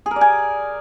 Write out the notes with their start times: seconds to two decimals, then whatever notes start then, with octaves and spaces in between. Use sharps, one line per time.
0.06 G#4
0.11 A#4
0.16 D5
0.21 G#5